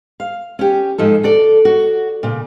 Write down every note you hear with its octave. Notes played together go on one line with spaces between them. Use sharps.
F5
C#4 G4
G#2 F3 D#4 A4
F#4 A4 D5
F#4
A#2 C#3